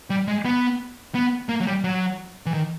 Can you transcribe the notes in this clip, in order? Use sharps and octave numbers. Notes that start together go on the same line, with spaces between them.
G3
G#3
B3
B3
A#3
F#3
G3
F#3
E3
D#3